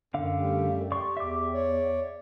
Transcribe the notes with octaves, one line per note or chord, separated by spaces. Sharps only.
F#2 D3 F5
G3 A3 G4
G4 D5 C6 C#6
E2 E5 D6
C#5 D5